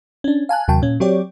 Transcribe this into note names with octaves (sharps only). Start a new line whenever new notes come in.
C#4 D4
F5 G#5 A5 F#6
D#2 C3 F#3 G5 A5
A#2 C#4
F#3 C4 G4 C#5 D5